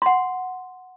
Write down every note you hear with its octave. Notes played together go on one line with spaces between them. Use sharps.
F#5 C6